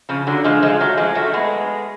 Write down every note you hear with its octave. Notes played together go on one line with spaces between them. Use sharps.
C#3 F3
D3 F#3
F3 G#3
F3 G#3
F#3 A3
F3 G#3
F#3 A3
G#3 B3